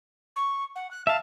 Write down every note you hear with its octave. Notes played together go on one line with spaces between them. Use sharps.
C#6
F#5
F#6
E5 F5 A5